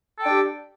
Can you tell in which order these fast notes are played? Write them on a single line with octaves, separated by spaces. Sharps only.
A4 G5 D4 G4